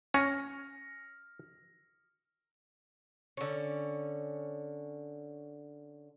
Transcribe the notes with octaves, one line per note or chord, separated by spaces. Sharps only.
C#4 F6 A#6 C#7
D3 C#4